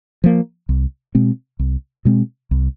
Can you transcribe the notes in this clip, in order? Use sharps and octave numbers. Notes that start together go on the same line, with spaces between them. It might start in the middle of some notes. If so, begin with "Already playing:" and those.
F3 A#3
C2
B2 G#3 C4
C2
B2 G#3 C4
C2